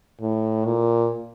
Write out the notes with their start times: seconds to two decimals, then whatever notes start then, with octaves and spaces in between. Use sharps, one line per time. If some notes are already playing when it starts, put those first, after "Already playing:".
0.21 A2
0.65 A#2